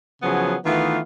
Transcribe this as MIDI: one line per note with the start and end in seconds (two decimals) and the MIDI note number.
0.23 0.56 49
0.23 0.56 53
0.23 0.56 54
0.23 0.56 59
0.23 0.56 64
0.23 0.56 68
0.66 0.99 51
0.66 0.99 52
0.66 0.99 57
0.66 0.99 59
0.66 0.99 63
0.66 0.99 65